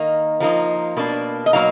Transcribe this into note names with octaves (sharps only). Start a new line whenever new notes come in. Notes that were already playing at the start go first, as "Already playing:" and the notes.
Already playing: D#3 A#3 D#4
F3 A#3 D#4
B2 A#3 D4
D#5
B2 F#3 A#3 D#4 F5